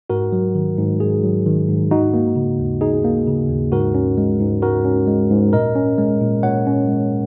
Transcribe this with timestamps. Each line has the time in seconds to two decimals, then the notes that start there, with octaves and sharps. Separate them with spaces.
0.10 G#2 F#4 A#4
0.32 F#3
0.55 D#3
0.77 G#2
1.00 G#2 G#4
1.24 F#3
1.46 D#3
1.68 G#2
1.91 D#4 F#4
2.14 A#3
2.36 C#3
2.59 D#2
2.81 D#4 G#4
3.04 A#3
3.27 C#3
3.49 D#2
3.72 G#2 F#4 A#4
3.95 C#4
4.18 G#3
4.39 G#2
4.62 G#2 F#4 A#4
4.85 C#4
5.07 G#3
5.31 G#2
5.53 A#2 A#4 D#5
5.76 C#4
5.98 G#3
6.21 A#2
6.43 A#2 C#5 F#5
6.67 C#4
6.89 G#3